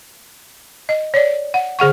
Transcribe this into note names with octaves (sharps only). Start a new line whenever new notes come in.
D#5
C#5 D5
F#5
D3 G#4 F#5 C#6